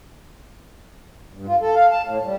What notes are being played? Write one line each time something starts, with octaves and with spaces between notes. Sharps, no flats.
G2
F4
A4
F5
A5
A2
G3